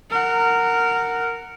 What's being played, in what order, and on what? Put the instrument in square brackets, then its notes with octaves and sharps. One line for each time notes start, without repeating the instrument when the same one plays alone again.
[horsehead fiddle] A#4 F#5